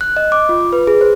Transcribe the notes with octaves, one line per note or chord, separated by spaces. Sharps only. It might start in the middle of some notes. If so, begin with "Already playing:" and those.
F#6
D#5
D6
F4
B4
G#4
C5